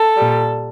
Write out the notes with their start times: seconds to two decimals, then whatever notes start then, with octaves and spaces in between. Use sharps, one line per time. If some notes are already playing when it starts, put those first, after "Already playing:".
Already playing: A4
0.17 A#2 G3